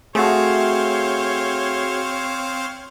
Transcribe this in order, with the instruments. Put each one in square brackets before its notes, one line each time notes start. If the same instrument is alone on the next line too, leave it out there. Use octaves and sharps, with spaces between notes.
[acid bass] A3 [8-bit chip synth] C4 C5 F5 [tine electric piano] F#4 G#4 [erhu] C#5